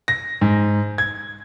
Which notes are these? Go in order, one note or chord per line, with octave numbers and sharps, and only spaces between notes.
A#6
G#2
G#6